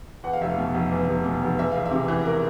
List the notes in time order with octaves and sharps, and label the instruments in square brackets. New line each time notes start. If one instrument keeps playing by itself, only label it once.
[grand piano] E2 F#5
F5
F1 E5
F5
B2
F1
E2
F1
B2
F1
E2 E5
E1 F5
E5
C3
E3
A#4